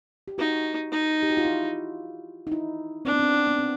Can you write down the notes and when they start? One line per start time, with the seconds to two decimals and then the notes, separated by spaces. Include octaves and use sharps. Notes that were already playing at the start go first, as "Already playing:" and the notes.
0.28 G4
0.38 D#4 F#4
0.92 D#4
1.23 G4
1.30 F#4
1.37 F4
1.45 E4
2.47 D#4
2.52 E4
3.05 C4 D4
3.12 B3
3.19 C4
3.47 B3
3.58 C4